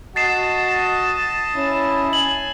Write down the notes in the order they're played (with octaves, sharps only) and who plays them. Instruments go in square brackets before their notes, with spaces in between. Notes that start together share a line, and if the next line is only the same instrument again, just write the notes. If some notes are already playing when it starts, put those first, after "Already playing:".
[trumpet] F#4 [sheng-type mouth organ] D#5 A5 [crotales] A6 C7 E7
[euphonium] C#4 [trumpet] E4
[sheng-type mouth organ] G#5 [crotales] F#7